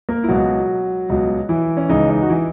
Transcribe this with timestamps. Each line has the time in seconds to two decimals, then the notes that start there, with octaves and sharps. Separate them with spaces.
0.09 A#3 A#4
0.24 E4
0.28 C#2 B2 F#3 F#4
1.09 C#2 B2 F#3
1.49 E3 E4
1.77 C#4
1.89 C#2 C#3 E3 D#4
2.09 D#4
2.22 F#4
2.29 E3 E4